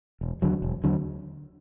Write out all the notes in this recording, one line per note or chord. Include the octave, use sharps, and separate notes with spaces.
E1
D#2 D3 F#3
E1
D#2 D3 F#3